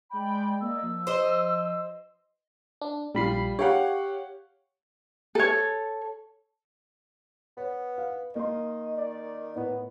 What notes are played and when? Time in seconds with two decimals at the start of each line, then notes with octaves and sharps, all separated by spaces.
0.11 G#3 D5 G5 B5
0.61 A#3 D5 D#5 E6
0.83 F3
1.07 C5 D#5
2.81 D4
3.15 A#1 G3 F4 B5 C7
3.59 G4 C#5 F5 F#5
5.35 A4 C#5
7.57 B3 C#5
7.98 F5
8.35 D#3 A#3 D#5 C6
8.97 D5
9.56 A2 B3